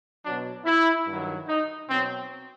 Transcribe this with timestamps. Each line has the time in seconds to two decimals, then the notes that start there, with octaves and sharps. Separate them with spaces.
0.24 B2 F#3 D4
0.66 E4
1.07 G2 D#3 F#3
1.48 D#4
1.89 B2 F#3 C4